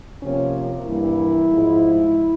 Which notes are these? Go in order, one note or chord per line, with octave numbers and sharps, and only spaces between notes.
C3 F3 A#3 C#4
G2 E3 G3 A#3 E4
G#2 F3 G#3